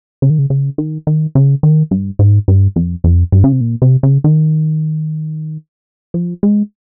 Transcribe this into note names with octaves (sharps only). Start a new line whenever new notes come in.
C#3
D#3
C#3
C#3
D#3
D#3
C#3
D#3
G2
G#2
G2
F2
F2
G2
C#3
C3
A#2
C3
C#3
D#3
F3
G#3